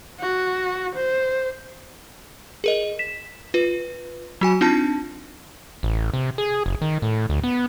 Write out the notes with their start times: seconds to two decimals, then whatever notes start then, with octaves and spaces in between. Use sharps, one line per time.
0.20 F#4
0.96 C5
2.64 G#4 A#4 D#5
2.99 B6 E7
3.54 F4 B4
4.41 F#3 F#4 G#5
4.61 C4 D4 D#4 F4 A5
5.83 A1
6.14 C3
6.38 G#4
6.66 F#1
6.81 D#3
7.02 A2
7.29 D2
7.43 B3